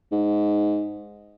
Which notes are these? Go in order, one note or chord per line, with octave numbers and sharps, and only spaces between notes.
G#2